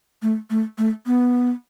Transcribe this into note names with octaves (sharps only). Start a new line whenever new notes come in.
A3
A3
A3
B3